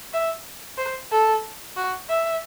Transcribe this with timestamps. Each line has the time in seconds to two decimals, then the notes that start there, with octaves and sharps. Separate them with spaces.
0.13 E5
0.78 C5
1.11 A4
1.77 F#4
2.09 E5